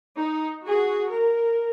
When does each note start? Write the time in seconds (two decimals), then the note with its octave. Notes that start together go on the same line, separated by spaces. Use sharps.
0.16 D#4
0.63 F#4 G#4
1.11 A#4